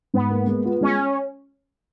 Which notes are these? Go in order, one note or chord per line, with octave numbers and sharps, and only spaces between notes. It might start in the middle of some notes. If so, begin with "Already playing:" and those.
G#2 B3
A#3
G#3
F4
G#3 C#4